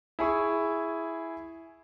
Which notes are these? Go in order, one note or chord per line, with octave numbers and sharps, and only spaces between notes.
E4 G#4 C#6